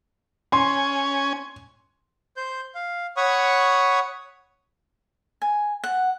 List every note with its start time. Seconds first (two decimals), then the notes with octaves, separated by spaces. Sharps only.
0.52 C#4 G#5 C6
2.37 C5 G6
2.75 F5
3.17 C#5 F#5 B5 C#6 D#6
5.42 G#5
5.84 F#5